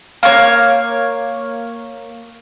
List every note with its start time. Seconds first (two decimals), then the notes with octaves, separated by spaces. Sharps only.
0.23 A#3 C#5